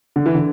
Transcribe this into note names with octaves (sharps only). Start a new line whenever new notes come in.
D3
E3
D3